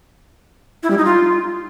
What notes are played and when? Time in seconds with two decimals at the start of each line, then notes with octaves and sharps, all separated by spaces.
0.83 E4
0.90 G3
0.98 D#4
1.05 F4